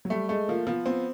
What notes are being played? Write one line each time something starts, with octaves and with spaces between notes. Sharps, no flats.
F#3
G3 A3
G#3 A3
F3 A#3
F3 B3
B3 C4